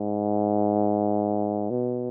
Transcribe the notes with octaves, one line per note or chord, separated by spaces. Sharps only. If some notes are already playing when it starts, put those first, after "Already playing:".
Already playing: G#2
B2